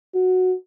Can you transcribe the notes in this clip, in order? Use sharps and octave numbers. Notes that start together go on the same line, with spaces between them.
F#4